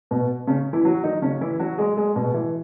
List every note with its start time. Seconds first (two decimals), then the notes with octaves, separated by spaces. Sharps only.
0.11 B2 B3
0.47 C#3 C#4
0.73 E3 E4
0.85 F#3 F#4
1.03 D#3 D#4
1.22 C#3 C#4
1.41 E3 E4
1.59 F#3 F#4
1.78 G#3 G#4
1.97 G#3 G#4
2.16 B2 B3
2.34 E3